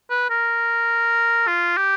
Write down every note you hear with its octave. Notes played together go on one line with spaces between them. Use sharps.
B4
A#4
F4
G4